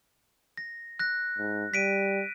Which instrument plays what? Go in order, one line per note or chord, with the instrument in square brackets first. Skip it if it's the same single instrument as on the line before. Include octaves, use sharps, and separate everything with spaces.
[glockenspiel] A#6
F#6 A#6
[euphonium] G#2
[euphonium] G3 [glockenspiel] B6 D7 D#7